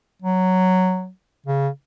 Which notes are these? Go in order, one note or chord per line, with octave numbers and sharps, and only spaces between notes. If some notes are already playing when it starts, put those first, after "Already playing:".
F#3
C#3